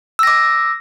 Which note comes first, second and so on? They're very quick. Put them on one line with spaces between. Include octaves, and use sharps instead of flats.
E6 A#6 D6